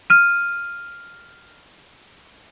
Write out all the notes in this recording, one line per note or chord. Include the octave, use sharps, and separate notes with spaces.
F6 D#7